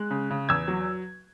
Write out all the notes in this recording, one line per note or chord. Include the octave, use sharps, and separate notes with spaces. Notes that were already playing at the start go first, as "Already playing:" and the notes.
Already playing: G#3 F#6
C#3
C#3
E2 E6 G#6
F#3